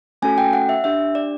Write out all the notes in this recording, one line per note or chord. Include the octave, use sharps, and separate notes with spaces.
A3 C#4 F#4 A4 G#5
G5
F#5
E5
D4 G4 E5
D5